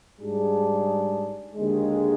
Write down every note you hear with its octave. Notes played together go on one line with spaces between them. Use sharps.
G#2 G3 D4 G#4
D#2 D3 G#3